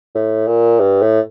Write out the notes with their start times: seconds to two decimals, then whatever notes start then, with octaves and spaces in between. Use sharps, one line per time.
0.15 A2
0.47 A#2
0.80 G2
1.02 A2